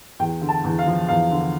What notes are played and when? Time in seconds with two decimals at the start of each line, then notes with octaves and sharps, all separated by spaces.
0.19 E2 G5
0.41 D3
0.49 A5
0.64 E2
0.79 F5
0.87 F3
1.08 E2 F5
1.31 D3